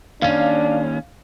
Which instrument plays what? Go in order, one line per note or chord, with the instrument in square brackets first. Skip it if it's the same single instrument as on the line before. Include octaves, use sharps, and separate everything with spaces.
[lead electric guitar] D#2 C#4 [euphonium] D4 [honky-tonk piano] F5